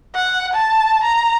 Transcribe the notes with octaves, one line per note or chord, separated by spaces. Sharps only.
F#5
A5
A#5